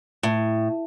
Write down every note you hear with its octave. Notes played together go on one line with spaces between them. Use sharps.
A2